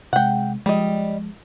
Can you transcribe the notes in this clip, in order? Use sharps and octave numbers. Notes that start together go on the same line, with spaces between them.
C3 G#3 F#5 G5
F3 G3 G#3 D#5